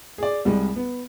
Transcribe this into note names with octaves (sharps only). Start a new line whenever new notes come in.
G#4 D5
C2 G3 G#3
B3